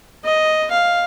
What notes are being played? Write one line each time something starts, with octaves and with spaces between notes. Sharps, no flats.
D#5
F5